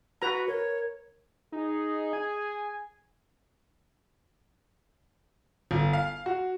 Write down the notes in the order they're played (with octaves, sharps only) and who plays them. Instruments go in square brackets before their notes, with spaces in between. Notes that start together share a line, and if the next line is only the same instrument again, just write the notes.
[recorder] F#4 [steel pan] B4 A#5
[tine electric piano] A#4 [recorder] C#5
[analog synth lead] D#4 [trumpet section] G#4
[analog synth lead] G#5
[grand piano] G1
F5
F#4